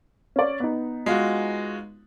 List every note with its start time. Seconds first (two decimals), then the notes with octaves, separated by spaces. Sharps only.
0.36 C#4 D5
0.60 B3 D#4
1.06 G#3 F4 F#4